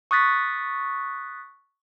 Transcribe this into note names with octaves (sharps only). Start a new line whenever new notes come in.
C#6 D#6 F#6 A6 B6